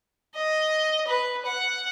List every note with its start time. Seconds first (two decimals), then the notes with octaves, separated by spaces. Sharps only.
0.35 D#5
1.07 B4
1.46 F#5